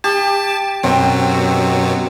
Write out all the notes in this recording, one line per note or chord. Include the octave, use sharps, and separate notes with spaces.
G4 A5
F#2 B2 F#3 C4